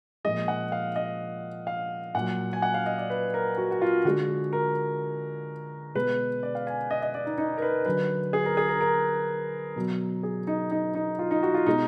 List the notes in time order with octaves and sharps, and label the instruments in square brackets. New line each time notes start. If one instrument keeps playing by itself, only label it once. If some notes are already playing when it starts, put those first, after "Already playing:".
[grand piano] A#2 F3 G#3 D#5
F#5
F5
D#5
F5
A#2 F#3 F#5
G#5
F#5
F5
D#5
D5
B4
A#4
F#4
F#4
F4
D3 G#3 F#4
A#4
B2 G#3 B4
D5
F5
G#5
D#5
D#5
D5
D#4
D#4
A#4
B4
D3 F#3 B4
G#4
A#4
G#4
A#4
A#4
B2 F#3
G#4
D#4
D#4
D#4
F4
D#4
F#4
F4
B2 G#3 D#4